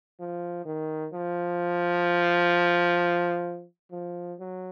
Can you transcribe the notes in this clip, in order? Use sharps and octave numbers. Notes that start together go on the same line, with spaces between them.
F3
D#3
F3
F3
F#3